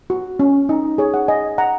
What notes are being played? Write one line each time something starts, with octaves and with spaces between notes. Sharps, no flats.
F#4
C#4
D#4
G#4 C#5
C#5 F#5
D#5 G#5
F#5 A#5